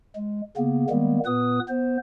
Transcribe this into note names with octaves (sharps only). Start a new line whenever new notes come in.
G#3
C#3 A#3 B3
D#3 G3 G#3 A#3 B3
A#2 B3 B4 D#6
B3 C5